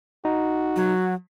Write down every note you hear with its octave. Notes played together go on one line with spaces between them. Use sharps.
D#4 F#4
F#3